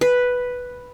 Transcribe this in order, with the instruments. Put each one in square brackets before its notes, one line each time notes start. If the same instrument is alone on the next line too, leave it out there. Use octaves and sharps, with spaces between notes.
[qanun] B4